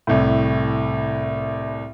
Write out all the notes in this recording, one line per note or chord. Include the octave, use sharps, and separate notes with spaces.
C2 A2